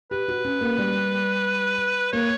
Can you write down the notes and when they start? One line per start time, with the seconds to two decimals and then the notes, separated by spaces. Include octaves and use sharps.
0.11 G4 B4
0.28 F#4
0.45 C#4
0.61 A#3
0.78 G3
2.13 A#3 C#5